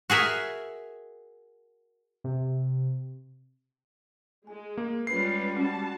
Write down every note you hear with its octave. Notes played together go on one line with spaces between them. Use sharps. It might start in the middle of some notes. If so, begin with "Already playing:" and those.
F#4 G#4 A#4 E5
C3
G#3 G#5
A#3
G3 G#3 C#4 F4 B4 C7
C#4 F#4 A5